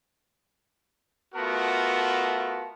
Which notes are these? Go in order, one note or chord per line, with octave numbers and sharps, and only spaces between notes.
A3 B3 F4 F#4 A#4 A5